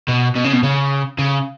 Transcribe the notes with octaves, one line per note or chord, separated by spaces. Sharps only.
B2
B2
C#3
B2
C#3
C#3